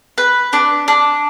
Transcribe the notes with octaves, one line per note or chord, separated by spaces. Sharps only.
B4
D4
D4